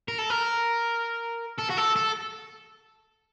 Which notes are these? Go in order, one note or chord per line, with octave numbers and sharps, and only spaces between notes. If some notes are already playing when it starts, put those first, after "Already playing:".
A#4
A4
A#4
A4
F#4
A4
A4